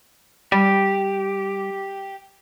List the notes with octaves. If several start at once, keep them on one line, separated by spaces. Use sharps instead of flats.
G3 G4